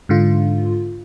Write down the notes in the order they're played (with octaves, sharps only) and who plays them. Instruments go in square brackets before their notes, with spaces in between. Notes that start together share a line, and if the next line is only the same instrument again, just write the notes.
[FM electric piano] G#2 D3 F4